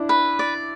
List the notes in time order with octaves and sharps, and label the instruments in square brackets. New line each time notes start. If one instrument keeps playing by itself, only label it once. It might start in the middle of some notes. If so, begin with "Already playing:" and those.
Already playing: [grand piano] D4 E4
[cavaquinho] B4
D5